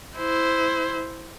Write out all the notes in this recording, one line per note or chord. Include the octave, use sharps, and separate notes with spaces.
E4 C5